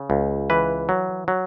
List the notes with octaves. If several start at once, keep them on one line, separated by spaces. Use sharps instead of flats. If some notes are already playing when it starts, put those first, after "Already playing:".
Already playing: C#3
C#2
E3 B4
F#3
F#3